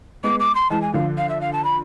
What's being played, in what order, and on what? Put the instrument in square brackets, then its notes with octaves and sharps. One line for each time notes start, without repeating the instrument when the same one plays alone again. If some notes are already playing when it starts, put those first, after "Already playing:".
[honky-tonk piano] G#3 B3 [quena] D6
[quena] D6
C6
[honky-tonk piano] E3 G#3 [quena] A5
[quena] G#5
[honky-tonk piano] D3 F3 [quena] F5
[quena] F5
E5
F5
A5
B5